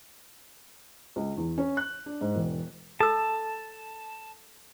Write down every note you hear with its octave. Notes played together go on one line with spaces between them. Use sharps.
C#2
E2
C#4
F#6
D4
G#2
E1
A4 A5 E6